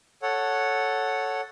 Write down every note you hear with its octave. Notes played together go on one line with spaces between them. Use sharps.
A4 C#5 F#5